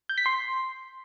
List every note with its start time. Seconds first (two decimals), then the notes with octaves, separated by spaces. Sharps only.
0.09 G6
0.18 B6
0.26 C6